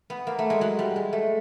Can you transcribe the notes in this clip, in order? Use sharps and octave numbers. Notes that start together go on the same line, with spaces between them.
B3
A#3
A3
G#3
F#3
G3
G#3
A3